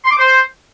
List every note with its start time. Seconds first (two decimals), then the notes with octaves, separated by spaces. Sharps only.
0.05 C6
0.11 D6
0.18 C5